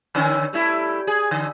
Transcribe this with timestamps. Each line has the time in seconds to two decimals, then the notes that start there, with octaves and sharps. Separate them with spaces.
0.15 D3 D#3 C#4
0.53 G3 A3 E4
1.07 G#4
1.31 D3